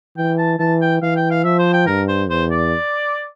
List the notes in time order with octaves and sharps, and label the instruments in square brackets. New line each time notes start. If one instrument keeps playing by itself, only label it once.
[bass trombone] E3 [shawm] G5
[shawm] A5
[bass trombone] E3 [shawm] A5
[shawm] G5
[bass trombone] E3 [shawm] F5
[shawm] G5
F5
[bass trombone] F3 [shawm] E5
[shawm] C5
G5
[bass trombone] G2 [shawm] A#4
[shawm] C5
[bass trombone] E2 [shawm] C5
[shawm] D5